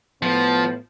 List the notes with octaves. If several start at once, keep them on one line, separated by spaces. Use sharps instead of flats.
A2 F3 B3